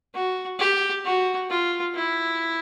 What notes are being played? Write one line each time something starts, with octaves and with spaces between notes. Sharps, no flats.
F#4
G4
F#4
F4
E4